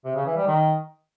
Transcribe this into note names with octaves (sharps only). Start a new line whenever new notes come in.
C3
C#3
E3
G3
D#3